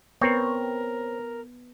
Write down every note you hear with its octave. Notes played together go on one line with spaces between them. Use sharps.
B3 C4 A#4 B4 C#5